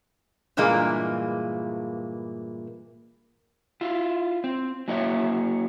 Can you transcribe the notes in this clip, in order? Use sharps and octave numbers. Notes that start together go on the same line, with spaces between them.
G2 A#2 E3 G#3 A#3
E4 F4
C4
F#3 A#3 E4 C#5 D#5 E5